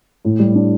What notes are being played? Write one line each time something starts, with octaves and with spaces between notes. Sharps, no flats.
A2
G3
D4